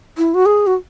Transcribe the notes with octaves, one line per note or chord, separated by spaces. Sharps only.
E4
F#4
G#4
F#4